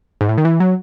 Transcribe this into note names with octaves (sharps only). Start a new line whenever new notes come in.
G#2
A2
D#3
E3
F#3